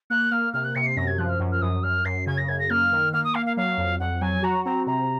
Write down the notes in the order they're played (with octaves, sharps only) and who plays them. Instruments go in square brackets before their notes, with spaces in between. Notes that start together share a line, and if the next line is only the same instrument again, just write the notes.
[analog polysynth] A#3 [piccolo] F#6
[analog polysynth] A#3 [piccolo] F6
[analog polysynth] C3 [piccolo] F6
[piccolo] F#6
[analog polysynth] C3 [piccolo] C#7
[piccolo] C7
[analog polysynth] F#2 [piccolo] A#6
[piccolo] G#6
[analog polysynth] F3 [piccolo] F#6
[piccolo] F6
[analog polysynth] F#2
[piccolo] F6
[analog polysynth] F#2 [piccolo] D#6
[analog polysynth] F#2 [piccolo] F6
[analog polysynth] F#2 [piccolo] C7
[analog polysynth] C#3 [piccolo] G#6
[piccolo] A#6
[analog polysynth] F#2 [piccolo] G#6
[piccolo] A#6
[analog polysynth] A#3 [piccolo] F6
[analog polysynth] D#3
[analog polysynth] A#3 [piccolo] F6
[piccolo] D#6
[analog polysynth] A#3 [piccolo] F5
[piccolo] F5
[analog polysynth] F#3 [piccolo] F5
[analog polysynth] F2
[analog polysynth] F2 [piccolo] F#5
[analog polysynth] F#3 [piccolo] G#5
[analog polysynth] F#4 [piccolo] A#5
[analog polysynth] C4 [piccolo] A#5
[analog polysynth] C3 [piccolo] A#5